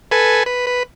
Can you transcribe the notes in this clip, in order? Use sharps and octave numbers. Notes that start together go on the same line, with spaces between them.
A4 B4 G#5
B4
B4